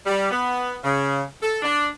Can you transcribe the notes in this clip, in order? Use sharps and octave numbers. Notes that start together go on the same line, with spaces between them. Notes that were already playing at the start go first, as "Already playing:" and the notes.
G3
B3
C#3
A4
D4